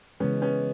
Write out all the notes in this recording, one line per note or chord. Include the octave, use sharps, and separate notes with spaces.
C#3 E3 G#3 B3 C#4
B3 C#4